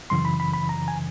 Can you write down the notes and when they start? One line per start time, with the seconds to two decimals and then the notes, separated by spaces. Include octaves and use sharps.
0.10 F#2 C#3 E3 C6
0.25 B5
0.40 B5
0.54 B5
0.69 A#5
0.88 G#5